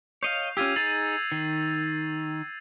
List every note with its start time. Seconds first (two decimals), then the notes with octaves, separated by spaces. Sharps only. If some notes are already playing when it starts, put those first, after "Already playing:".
0.23 C#5 D#5 F5 G6 C7 F7
0.57 C#4 F4 G4 E6 G#6 D#7
0.76 D#4 G#4 A6 C7 F#7
1.32 D#3